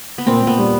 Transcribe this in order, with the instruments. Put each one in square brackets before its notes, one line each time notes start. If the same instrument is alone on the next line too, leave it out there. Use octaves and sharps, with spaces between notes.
[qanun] B3
[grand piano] A#2 [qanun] C4
[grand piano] A#2
[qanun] B3
[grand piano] G3